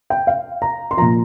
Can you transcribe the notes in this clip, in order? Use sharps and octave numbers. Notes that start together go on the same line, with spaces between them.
G5
F5
A#5
C6
A#2 F3 A#5